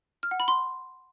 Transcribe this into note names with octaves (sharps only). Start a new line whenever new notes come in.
F6
F#5
B5
C6